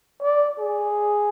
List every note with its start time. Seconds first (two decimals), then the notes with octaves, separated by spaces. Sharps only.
0.22 D5
0.59 G#4